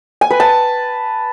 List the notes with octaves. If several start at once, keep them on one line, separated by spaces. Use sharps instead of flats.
G#5
B4
A5